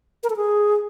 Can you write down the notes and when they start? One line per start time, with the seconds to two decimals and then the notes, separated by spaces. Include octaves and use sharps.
0.23 A#4
0.30 A4
0.36 G#4